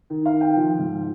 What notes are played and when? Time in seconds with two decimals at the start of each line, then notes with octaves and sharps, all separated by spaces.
0.10 D#3
0.26 F5
0.33 D#3
0.41 G5
0.56 F3
0.79 G#2